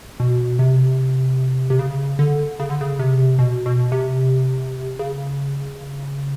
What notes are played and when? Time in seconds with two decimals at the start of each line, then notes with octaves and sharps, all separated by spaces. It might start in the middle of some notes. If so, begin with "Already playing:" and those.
0.20 B2
0.59 C3
1.70 C3
1.79 C#3
2.19 D3
2.60 C#3
2.70 D3
2.81 C#3
2.99 C3
3.39 B2
3.66 B2
3.92 C3
4.99 C#3